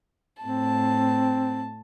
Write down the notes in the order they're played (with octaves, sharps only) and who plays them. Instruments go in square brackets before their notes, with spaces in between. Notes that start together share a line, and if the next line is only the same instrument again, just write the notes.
[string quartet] A2 A5 [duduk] C4